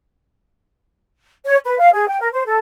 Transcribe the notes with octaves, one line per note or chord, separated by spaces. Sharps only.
C#5
B4
F5
G#4
G5
A#4
C5
A4